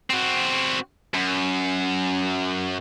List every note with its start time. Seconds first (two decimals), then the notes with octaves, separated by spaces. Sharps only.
0.10 C4 F#4
1.14 F#2